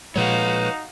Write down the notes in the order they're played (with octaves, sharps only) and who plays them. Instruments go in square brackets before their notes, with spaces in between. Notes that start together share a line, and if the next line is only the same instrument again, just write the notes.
[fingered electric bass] A#2 F3 G#3 [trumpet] D#4 [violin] F#4 F5 [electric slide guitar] B4 C#5